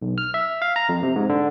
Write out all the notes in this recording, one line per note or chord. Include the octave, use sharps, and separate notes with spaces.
B1
F6
E5
F5
A#5
F2
C3
G#2
D3